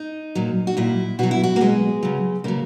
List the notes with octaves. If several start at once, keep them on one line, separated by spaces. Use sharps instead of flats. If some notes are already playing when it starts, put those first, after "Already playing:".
Already playing: D#4
A#2 F#3
F#4
A#2 F#3 E4
B2 F#3 F#4
E4
F#4
A#3
B2 F#3 G#3
C#3 F#3
C#3 F#3 A#3